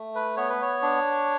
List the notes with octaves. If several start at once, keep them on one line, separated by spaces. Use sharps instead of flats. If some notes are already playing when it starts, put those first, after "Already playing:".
Already playing: A3
B4
B3 C#5
B4
C#5
D4